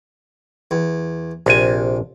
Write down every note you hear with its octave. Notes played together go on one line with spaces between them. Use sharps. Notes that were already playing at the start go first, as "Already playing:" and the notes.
E2
A#1 C3 G#5